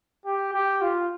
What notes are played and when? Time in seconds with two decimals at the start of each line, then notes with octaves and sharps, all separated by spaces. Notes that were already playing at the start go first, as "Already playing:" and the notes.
0.25 G4
0.53 G4
0.81 F4